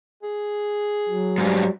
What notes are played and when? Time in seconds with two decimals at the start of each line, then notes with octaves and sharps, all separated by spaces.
0.23 G#4
1.09 F#3
1.38 G#2 G3